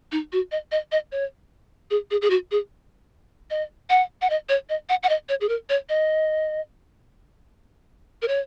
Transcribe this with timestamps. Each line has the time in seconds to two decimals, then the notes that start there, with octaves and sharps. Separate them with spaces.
0.12 D#4
0.32 F#4
0.52 D#5
0.72 D#5
0.92 D#5
1.12 C#5
1.91 G#4
2.11 G#4
2.22 G#4
2.30 F#4
2.51 G#4
3.51 D#5
3.90 F#5
4.22 F#5
4.30 D#5
4.49 C#5
4.69 D#5
4.89 F#5
5.03 F#5
5.09 D#5
5.29 C#5
5.41 G#4
5.49 A#4
5.69 C#5
5.89 D#5
8.22 A#4
8.28 C#5